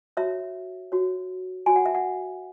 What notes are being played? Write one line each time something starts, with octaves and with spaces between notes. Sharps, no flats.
F#4 C#5 E5
F#4 C#5
F#4 C#5 G#5
F#5
E5
F#5